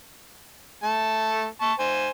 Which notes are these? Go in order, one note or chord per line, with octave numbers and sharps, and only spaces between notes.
A3 A5
A5 C#6
C5 G#5